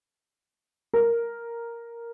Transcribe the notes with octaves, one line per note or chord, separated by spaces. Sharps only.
A#4